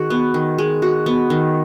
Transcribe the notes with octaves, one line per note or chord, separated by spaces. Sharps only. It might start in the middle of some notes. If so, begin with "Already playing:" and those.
Already playing: D#3 G#3 F#4
B3
D#3
G#3
F#4
B3
D#3